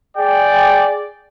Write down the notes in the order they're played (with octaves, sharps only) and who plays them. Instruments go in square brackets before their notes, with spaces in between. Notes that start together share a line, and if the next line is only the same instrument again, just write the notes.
[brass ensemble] G#4 D5 G5